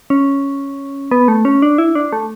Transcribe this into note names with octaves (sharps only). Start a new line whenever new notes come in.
C#4
B3
A3
C#4
D4
E4
D4
A3